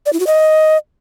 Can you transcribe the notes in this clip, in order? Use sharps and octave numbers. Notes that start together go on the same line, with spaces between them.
D5
E4
F#4
D#5